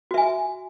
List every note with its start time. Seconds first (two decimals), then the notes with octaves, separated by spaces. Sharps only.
0.11 F#4
0.14 E5
0.18 G#5